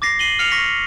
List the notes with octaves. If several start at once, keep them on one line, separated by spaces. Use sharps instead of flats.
D6 A6 A#6 C7
C7 D#7 F#7 G7
F6 C7 C#7 F7
C#6 A#6 B6